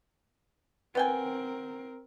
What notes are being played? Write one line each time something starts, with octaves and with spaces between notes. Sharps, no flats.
B3 C4 A#4 G5 G#5